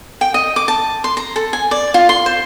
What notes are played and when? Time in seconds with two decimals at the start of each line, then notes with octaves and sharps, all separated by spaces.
0.21 G5
0.34 D#5
0.56 D6
0.68 A5
1.04 C6
1.17 A#5
1.36 A4
1.53 G#5
1.71 D5
1.94 F4
2.09 C6
2.26 C5